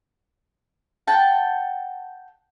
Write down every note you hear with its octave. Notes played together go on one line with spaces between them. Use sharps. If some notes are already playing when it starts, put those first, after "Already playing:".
F#5 G5 A5